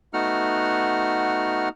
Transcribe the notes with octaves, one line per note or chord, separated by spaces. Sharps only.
A3 B3 D#4 F#4 F#5 F6